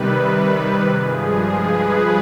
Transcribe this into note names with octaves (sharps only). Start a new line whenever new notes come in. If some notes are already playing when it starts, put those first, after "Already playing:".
Already playing: C3 D#3 G3 B4
G2 F3 G#3 G#4
G#4
B4